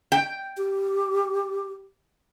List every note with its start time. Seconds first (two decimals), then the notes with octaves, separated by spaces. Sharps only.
0.12 G5
0.57 G4